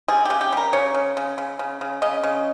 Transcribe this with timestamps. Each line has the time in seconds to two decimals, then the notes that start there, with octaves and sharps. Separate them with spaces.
0.08 G3 G#4
0.25 C#3 G4
0.41 G4
0.52 G3 A#4
0.73 C#3 C#5
0.94 C#3
1.17 C#3
1.38 C#3
1.59 C#3
1.81 C#3
2.02 C#3 D#5
2.23 C#3